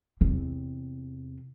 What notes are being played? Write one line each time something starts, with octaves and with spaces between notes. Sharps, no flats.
E2 C3